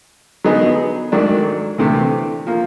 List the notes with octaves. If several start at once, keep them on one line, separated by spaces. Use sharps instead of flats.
D3 F#3 B3 D#4 G#4
G#2 D#3 F#3 A3 D4
D2 C3 E3 A3
F3 A#3